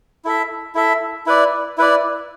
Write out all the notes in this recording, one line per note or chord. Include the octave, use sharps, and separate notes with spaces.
E4 A4 E5
E4 A4 E5
E4 B4 D5
E4 B4 D5